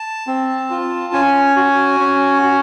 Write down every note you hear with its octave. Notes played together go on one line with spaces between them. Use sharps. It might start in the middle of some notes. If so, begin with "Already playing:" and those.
Already playing: A5
C4
F4
C#4 G#5
F#4
C#4
F#4